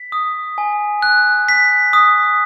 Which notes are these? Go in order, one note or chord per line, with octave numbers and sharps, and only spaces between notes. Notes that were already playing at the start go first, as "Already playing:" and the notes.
Already playing: B6
D#6
G#5
F#6
B6
D#6